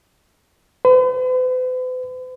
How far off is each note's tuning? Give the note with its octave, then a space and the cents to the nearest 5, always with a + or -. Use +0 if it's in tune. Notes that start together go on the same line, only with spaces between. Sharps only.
B4 +45